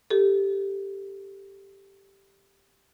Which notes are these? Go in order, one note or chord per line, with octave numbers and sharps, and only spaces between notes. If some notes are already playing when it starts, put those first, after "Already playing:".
G4 A4